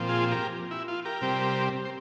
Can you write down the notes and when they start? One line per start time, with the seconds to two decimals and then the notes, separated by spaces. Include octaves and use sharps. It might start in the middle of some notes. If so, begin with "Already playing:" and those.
Already playing: A#2 F3 C4
0.09 F4 G#4
0.31 G4 A#4
0.71 E4
0.88 F4
1.05 G4 A#4
1.22 C3 G3 C4
1.85 C5